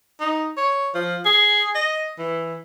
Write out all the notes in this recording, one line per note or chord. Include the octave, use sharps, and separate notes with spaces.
D#4
C#5
F3
G#4
D#5
E3